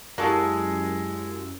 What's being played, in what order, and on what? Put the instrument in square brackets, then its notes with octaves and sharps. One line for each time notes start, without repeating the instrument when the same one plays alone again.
[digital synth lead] F#2 [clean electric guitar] G#3 [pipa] A#3 F#4 A4 [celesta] E4 G4 E6